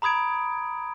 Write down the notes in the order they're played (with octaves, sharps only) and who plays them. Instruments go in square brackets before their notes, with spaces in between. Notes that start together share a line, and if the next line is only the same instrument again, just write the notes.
[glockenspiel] A#5 B5 D#6 G#6 D7